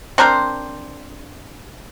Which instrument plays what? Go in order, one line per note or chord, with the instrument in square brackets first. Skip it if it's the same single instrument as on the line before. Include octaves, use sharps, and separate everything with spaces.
[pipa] C4 D4 A#4 C5